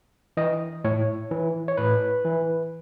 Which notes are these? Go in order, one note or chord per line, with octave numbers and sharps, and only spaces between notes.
E3 D#5
A2 C#5
E3
C#5
A2 B4
E3